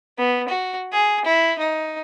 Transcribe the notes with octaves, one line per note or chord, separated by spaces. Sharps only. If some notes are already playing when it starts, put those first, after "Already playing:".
B3
F#4
G#4
E4
D#4